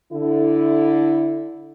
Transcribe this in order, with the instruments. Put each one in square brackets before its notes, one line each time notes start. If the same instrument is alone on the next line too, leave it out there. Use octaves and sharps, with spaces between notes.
[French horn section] D3 E4